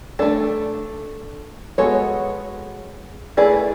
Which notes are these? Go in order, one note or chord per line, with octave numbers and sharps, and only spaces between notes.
A3 D4 A4
G#3 B3 F#4 A4 C#5
A3 E4 G#4 B4 D5